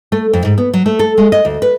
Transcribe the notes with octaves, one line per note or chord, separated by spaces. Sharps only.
A3
F2
G#2
B3
F#3
A3
A4
G#3
D#5
D2
B4